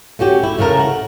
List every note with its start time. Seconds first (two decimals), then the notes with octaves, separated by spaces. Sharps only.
0.19 A3 C#4 F#4 G4
0.43 E4
0.59 A2 C#3 A3 A#4
0.79 F#5